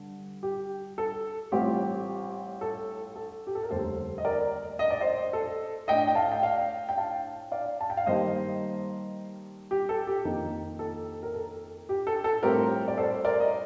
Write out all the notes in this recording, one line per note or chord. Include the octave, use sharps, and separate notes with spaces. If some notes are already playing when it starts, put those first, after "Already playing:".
Already playing: G2 D3
G4
A4
A1 A2 G3 C4 F4 G4
A4
A4
G4
A4
A#4
F1 D#2 D3 G3 A4 C5
D#5
A#4 D5
D#5
D5
C5 D#5
A4
A2 A3 D4 D#5 G5
G5
F5 A5
G5
D5 F5
G5
F5 A5
D5 F5
A5
G5
F5
G2 D#3 G3 A#3 C5 D#5
G4
A4
G4
F2 D#3 A#3 D#4
A4
A#4
A4
G4
A4
A4
A2 G3 C4 F4 G4 A#4
D5
A4 C5
A#4 D5
D#5